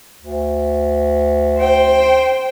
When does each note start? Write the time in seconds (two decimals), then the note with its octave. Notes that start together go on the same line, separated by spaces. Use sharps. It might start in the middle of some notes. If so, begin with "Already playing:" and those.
0.21 D2
1.58 C5 G5